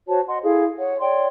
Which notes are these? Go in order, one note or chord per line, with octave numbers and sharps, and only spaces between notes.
F#4 C5 C#5 A5
D#5 F#5 C6
E4 G#4 A4 F5
C#5 F#5
C#5 D5 G5 C6